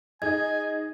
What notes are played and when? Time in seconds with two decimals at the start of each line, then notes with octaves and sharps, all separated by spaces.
0.22 D#4 G#4 D#5 G#5 G#6